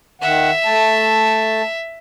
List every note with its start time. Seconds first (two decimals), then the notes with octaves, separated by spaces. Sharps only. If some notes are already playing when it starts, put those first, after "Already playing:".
0.22 D#3 E5 F#5
0.65 A3 A5